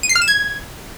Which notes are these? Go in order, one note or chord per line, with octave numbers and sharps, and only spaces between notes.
D#7
C7
F6
E7
G#6